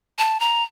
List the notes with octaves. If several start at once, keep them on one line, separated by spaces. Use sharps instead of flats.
A5
A#5